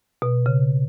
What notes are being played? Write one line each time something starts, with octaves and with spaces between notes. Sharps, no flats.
B2
C#3